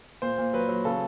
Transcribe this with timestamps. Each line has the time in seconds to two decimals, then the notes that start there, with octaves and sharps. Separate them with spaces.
0.22 A#2 C5
0.38 A#2
0.53 F#3 B4
0.69 F#3
0.85 C#3 A4